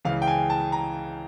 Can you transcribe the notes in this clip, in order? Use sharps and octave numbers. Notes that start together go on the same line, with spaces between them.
C#2 C#3 E3 F5
G5
G#5
A5
A#5